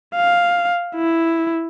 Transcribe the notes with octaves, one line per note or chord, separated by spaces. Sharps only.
F5
E4